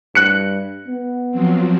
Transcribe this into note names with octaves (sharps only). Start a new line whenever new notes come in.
G2 F#6 C#7
B3
F3 F#3 C4